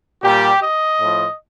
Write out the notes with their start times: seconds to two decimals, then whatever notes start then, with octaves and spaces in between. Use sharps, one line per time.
0.24 A#2 G3 G4
0.62 D#5
1.00 A2 F3